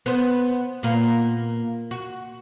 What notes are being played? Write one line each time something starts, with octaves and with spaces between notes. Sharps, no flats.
B3 C5
A#2 A#3 B3
F#4